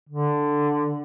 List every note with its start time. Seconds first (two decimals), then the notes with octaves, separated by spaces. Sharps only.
0.09 D3